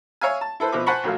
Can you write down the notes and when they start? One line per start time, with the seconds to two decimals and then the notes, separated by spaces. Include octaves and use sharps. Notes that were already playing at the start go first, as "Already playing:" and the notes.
0.21 C#5 E5 F5 G#5
0.41 A5
0.60 E4 A4 B4 C5
0.72 B2 F3 C4 B4 E5 D6
0.87 C5 F#5 G#5 A5 B5 C#6
1.04 A#1 F#3 A3 F5